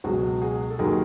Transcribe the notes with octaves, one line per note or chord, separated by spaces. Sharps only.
C#2 B2 F#3 F#4 G#4
F#4 G#4
A4
D#2 D#3 F#3 G#4 A#4